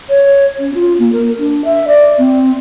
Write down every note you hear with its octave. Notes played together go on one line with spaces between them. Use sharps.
C#5
C#4
F4
A#3
A#4
D4
E5
D5
C4